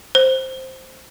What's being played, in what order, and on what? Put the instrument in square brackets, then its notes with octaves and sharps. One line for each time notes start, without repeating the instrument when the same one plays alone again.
[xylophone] C5